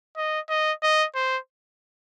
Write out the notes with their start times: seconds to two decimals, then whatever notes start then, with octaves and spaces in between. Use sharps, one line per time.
0.17 D#5
0.49 D#5
0.83 D#5
1.15 C5